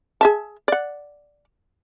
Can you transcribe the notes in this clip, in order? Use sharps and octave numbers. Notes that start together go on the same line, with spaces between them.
G#4 E5 A5
D5 F#5